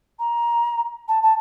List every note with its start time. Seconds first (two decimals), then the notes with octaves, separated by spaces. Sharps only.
0.19 A#5
1.08 A5
1.22 A5